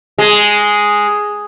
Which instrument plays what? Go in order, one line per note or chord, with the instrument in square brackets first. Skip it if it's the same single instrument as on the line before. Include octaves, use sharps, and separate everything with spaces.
[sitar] G#3